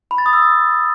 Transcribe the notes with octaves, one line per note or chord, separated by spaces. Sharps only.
B5
A6
D#6
E6